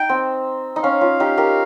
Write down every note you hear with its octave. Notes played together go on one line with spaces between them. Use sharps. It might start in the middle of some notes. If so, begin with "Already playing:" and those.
Already playing: D#4 G5
C4
D#4
C#4 F5
C#4 F4
D#4 G4
G4 A#4